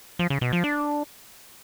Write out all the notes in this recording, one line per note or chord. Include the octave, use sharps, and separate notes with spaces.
F3
C#3
B2
F3
D4